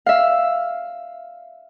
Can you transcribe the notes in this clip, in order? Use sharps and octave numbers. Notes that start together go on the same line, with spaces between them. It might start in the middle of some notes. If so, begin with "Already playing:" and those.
E5 F5